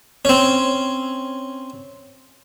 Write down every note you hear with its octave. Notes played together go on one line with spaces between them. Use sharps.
C4 C#4